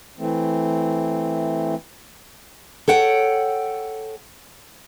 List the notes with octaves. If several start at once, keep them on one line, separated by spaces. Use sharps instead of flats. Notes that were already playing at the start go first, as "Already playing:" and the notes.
E3 A3 C4
A4 C#5 F#5 G5